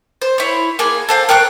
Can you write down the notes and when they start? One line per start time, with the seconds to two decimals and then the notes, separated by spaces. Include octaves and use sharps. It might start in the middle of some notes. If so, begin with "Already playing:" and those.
0.22 C5
0.38 E4 C#5
0.79 A#3 G#4 G#5
1.09 A4 C5 F5
1.29 A#4 G5 C#6 F#6